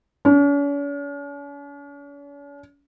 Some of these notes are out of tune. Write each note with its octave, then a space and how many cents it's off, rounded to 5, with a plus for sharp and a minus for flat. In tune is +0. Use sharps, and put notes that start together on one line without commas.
C#4 +45